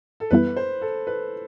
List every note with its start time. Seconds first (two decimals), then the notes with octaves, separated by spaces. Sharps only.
0.20 A4
0.31 F#2 E3 G3 B3 E4 B4
0.56 C5
0.81 A4
1.07 B4